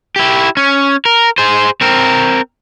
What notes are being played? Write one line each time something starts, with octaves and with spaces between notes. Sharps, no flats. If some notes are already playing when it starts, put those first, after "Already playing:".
E4 G4
C#4
A#4
G#4 C5
C4 A#4